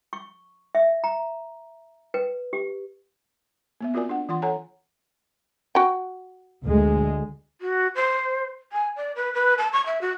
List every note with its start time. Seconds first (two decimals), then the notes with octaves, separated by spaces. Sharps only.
0.13 C#6
0.75 E5
1.04 A#5
2.14 B4
2.53 G4
3.81 A#3 B3 E5
3.94 C4 F4 F#4 A#4 D5 G#5
4.09 D4 F#5
4.29 E3 F4 F#5 C6
4.42 A4 C#5 F#5 G#5 A#5
5.75 F#4 G5
6.64 D2 G#3
7.61 F#4
7.95 C5
8.72 G#5
8.96 D5
9.16 B4
9.34 B4
9.58 A5
9.73 C#6
9.86 E5
10.01 F#4